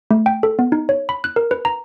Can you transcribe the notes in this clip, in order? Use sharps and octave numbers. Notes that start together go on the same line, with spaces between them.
A3
G5
A4
B3
D#4
C#5
B5
F#6
A#4
B4
A#5